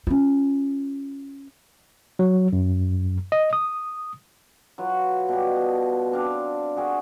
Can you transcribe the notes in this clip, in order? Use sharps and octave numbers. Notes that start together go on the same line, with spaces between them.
C#4 F4
F#3
F#2
D#5
D#6
F#3 F4 B4
B2 G3
D#5 A5
C4 D4 F5
F#4 G#4 A#4